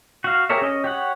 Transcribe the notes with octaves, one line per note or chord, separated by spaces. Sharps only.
F#4 F5
G4 G#4 A#4 C#5 E5
C#4 D#5
G4 C#5 F#5